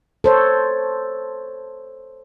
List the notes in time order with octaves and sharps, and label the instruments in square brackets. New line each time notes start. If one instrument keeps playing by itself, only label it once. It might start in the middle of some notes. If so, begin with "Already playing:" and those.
[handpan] A4 C5 C#5